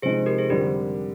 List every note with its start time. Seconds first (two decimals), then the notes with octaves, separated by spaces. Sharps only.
0.02 C3 F3 G#3 D#4 G#4 C5
0.26 G4 A#4
0.38 G#4 C5
0.49 F2 D3 G3 D4 G4 A#4